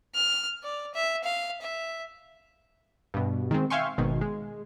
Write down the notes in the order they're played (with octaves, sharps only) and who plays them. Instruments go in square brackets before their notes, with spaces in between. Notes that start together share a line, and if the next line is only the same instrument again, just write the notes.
[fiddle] F6
D5
E5
F5
E5
[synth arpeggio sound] G2 B2
D#3 G#3 C4
E5 F5 G5 G#5 C6 C#6
G#1 G#2 B2 D#3
G#3